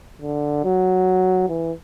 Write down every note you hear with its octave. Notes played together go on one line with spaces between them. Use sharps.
D3
F#3
E3